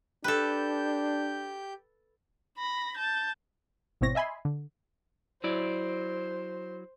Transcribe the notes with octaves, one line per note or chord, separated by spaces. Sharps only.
D4 G4 A4 B4 G6
B5 A#6
A5 G6
G#1 B2 E3 C4 C#5 A#6
D#5 E5 G#5 B5 C6
D3
F#3 E4 C5 D5